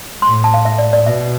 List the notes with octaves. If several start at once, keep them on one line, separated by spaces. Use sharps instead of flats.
A2 C6
A5
F5
E5
D5
D5
B2 E5